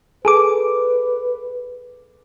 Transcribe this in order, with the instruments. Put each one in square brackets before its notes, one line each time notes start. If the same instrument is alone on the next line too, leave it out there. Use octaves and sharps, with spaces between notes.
[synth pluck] G#4 A4 D6 [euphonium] B4